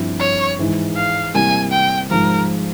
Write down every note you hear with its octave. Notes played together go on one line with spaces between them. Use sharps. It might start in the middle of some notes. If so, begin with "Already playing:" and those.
Already playing: G2 F3 C4 E4
C#5
G#2 E3 G#3
F5
C3 G3 A#3 E4 G#5
G5
G#2 F3 G#3 A#4